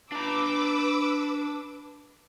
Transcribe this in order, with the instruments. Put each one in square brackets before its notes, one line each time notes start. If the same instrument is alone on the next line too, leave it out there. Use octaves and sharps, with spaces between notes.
[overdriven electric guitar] D4 A#5 [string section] B4 D6 E6